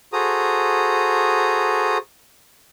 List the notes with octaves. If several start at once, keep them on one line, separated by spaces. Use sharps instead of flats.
F#4 G#4 A4 C5 A#5 D#6